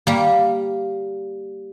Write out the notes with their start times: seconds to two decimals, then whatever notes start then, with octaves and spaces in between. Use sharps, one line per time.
0.07 G3 A#3